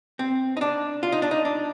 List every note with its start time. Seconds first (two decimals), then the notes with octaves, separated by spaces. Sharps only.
0.19 C4
0.57 D#4
0.61 D4
1.03 F4
1.12 D#4
1.22 D4
1.31 D#4
1.45 D4